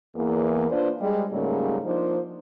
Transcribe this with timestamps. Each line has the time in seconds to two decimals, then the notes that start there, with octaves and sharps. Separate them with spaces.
0.16 E2 A#3
0.70 D4 F4 B4 C5 D5
1.01 G3 G#3
1.31 G#2 C#3 F#3 G3 A3 A#3
1.84 F3 A#3 D4 D#4 C5